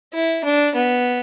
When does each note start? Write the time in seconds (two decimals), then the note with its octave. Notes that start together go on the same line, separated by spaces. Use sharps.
0.14 E4
0.44 D4
0.75 B3